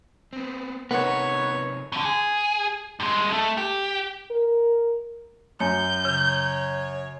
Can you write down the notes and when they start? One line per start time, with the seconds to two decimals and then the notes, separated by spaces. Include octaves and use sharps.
0.33 B3 C4
0.91 C3 B3 D#4 A#4 C#5
1.92 B2 D3
2.05 G#4
3.00 G2 G#3
3.33 A3
3.57 G4
4.31 A#4
5.60 F#2 C#5 G6
6.05 C#3 C#5